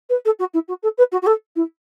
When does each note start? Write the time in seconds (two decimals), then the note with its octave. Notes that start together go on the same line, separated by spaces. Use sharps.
0.09 B4
0.25 A4
0.39 F#4
0.54 E4
0.68 F#4
0.83 A4
0.98 B4
1.12 F#4
1.22 F#4
1.26 A4
1.56 E4